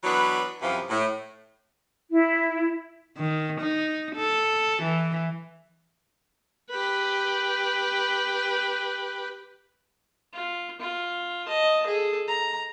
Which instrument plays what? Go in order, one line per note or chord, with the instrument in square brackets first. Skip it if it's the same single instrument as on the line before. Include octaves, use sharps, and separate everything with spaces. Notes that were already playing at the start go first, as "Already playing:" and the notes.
[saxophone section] E3 F#3 B3 D4 B4
F#2 C3 E3 F3
A2
[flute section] E4
[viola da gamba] D#3
D#4
A4
E3
[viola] G4 B4
[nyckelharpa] F4
F4
D#5 A5
G#4 A4
A#5